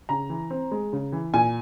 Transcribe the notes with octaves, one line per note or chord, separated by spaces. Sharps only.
C#3 A#5
E3
C4
G#3
C#3
E3
A#2 G#5